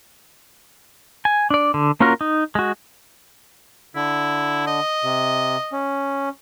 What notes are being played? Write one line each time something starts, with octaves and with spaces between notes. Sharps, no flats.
G#5
D4 D5
D3
A#3 C#4 F4 F#4 A#4
D#4
G#3 F#4
D3 E4
D#5
C3
C#4